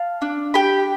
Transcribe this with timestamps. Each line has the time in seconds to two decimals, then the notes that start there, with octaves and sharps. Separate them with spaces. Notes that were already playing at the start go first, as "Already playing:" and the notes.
Already playing: F5 A5
0.22 D4
0.54 G4 G5 B5